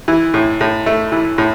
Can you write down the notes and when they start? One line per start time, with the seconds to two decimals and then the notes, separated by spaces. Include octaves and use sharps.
0.08 E3
0.34 A2
0.61 A2
0.86 A3
1.12 E3
1.38 A2